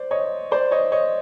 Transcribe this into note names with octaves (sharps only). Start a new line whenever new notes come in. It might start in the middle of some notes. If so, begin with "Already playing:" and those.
Already playing: C5 D5
C#5 D#5
C5 D5
C#5 D#5
C#5 D#5